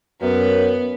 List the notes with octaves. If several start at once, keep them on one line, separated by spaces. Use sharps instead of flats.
F#2 B3